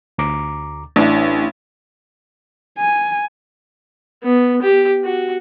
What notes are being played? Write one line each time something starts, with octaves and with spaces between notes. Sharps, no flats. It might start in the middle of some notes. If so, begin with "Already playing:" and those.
D2 A#5 D6
A1 D4 E4
G#5
B3
G4
F#4